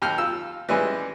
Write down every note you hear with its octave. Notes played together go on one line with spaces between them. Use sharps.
D#2 G5 F6
F4 E6
E3 G3 G#3 C#4